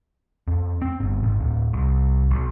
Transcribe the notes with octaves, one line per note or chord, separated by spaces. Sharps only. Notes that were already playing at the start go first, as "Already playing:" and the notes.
F2
C4
G1
G#1
D1
C2
B1